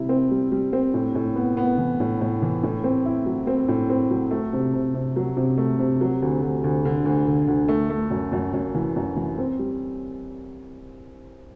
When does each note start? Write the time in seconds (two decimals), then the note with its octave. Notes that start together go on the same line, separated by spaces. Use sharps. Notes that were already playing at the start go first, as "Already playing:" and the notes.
Already playing: C3 G3 E4
0.09 C4
0.31 G3
0.52 G3
0.73 C4
0.94 A2
1.15 A2
1.36 B3
1.57 B3
1.78 E3
2.00 A2
2.21 A2
2.42 E3
2.63 A2
2.84 C4
3.06 E4
3.26 F#3
3.47 C4
3.68 A2
3.89 C4
4.10 F#3
4.31 A3
4.53 C3
4.74 C3
4.94 C3
5.16 F#3
5.37 C3
5.58 A3
5.79 C3
6.01 F#3
6.22 D2
6.42 D2
6.64 D2
6.85 D3
7.05 D2
7.27 D3
7.48 D2
7.68 A3
7.90 A3
8.11 F#2
8.32 F#2
8.53 F#2
8.74 E3
8.96 F#2
9.16 E3
9.38 C4
9.59 G3